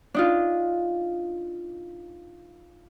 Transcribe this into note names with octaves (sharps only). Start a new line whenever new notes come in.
D4 D#4 F4